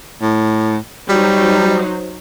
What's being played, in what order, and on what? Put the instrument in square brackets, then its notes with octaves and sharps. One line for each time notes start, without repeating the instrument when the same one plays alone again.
[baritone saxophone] A2
[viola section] F#3 D#4 C5 [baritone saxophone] G3